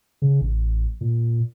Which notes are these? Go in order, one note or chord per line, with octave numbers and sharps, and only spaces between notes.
C#3
A1
A#2